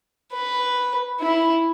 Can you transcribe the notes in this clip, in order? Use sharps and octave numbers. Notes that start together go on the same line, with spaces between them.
B4
E4